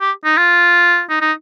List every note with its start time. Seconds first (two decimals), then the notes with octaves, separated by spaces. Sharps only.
0.01 G4
0.25 D#4
0.37 F4
1.10 D#4
1.21 D#4